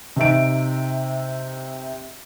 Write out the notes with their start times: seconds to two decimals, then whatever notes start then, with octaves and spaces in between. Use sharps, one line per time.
0.16 C3 D#4 E5 D7